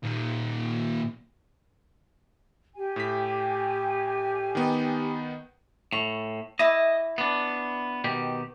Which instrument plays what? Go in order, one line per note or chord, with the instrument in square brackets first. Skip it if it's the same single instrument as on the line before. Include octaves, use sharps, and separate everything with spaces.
[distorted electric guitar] A#2 D#3
[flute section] G4 G#5
[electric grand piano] A2 B6
D#3 B3 D#4
[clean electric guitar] A2 [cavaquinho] C#6
[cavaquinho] E4 E5 D6 [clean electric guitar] D#5
[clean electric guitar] B3 D4
B2 D#3 G4